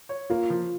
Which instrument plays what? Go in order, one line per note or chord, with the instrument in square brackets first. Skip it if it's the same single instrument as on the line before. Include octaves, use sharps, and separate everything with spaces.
[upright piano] C#5
[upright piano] A#3 [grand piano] F4
[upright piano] F3